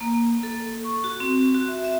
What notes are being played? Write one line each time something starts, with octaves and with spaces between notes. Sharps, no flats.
A#3
A4
C#6
F#4
C4
F#4
E5
E5